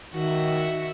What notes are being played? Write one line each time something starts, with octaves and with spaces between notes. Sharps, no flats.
D#3 F#4 E5